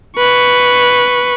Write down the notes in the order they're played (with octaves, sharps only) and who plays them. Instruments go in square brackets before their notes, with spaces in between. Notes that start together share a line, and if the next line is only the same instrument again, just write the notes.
[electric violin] B4 C#6